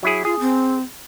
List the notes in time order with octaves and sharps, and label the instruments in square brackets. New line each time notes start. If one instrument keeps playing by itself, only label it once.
[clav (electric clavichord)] F#3 E4 G#4
[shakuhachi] F4 [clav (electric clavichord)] G#4
[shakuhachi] C4